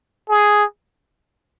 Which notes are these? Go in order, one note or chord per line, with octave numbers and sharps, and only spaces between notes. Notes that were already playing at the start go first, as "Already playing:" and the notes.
G#4